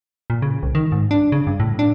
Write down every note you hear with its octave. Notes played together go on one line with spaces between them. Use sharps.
A#2
C#3
C2
D#3
G#2
D4
C#3
G2
A2
D4